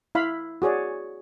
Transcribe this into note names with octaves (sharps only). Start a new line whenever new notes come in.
E4 F5 B5
F#4 G#4 C#5 D5